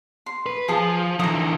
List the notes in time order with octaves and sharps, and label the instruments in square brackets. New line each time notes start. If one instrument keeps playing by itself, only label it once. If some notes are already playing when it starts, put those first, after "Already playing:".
[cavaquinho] C6
[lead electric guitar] B4
[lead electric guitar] F3 [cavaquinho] G#4 A5
[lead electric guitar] D3 E3 [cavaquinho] A#4 D#6